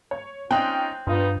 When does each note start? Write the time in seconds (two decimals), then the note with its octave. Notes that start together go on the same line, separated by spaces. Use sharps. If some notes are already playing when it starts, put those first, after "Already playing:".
0.11 C#5
0.51 C4 C#4 D#4 F4 G5 F#6
1.07 G2 G3 B3 D#4 F4